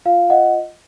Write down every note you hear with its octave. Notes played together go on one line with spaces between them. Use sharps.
F4 F5
D#5 F#5